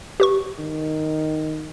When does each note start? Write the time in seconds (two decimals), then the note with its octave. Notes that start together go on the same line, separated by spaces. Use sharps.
0.20 G4 B4 C#6
0.59 D#3